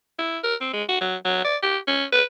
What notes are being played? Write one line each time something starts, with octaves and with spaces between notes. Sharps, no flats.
E4
A#4
C4
G#3
F#4
F#3
F#3
D5
G4
C#4
B4